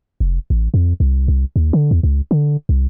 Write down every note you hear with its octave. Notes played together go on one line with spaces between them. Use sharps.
F1
A1
F2
C2
C2
D#2
D3
E2
C#2
D3
C2